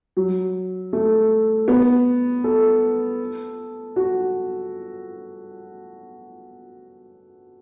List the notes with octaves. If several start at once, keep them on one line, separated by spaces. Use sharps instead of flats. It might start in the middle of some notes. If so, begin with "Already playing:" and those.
F#3
A3
B3
A4
F#4